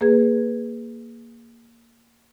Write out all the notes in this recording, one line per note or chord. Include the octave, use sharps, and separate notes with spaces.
A#3 G#4 B4 G#6